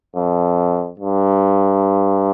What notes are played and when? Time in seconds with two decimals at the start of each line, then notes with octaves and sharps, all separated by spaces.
0.16 F2
0.99 G2